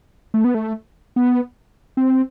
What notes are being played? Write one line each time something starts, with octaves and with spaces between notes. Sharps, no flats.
A3
B3
A3
B3
C4